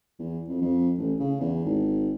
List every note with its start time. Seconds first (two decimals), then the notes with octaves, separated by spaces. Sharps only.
0.19 E2
0.48 F2
0.61 F2
0.99 A1
1.20 C#3
1.40 E2
1.64 G#1